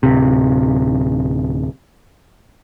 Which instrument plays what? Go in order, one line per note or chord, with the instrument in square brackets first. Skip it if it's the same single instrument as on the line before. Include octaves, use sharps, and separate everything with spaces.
[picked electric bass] D1 C3